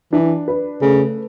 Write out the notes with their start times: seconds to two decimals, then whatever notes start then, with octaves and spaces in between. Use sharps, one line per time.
0.12 E3 D4
0.48 B4
0.82 C#3 A3